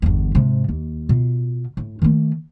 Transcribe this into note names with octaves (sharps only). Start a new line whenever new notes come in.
G1 E2
G#2 C3
D#2
B2 F4
A2
D#3 A3